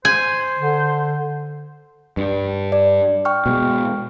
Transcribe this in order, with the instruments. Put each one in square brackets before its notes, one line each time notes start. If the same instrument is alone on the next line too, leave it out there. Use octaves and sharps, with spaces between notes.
[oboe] C5 [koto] G#5
[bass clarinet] D3
[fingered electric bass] G2
[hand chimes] D5
G5 C#6 F6
[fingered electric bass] B2 G#3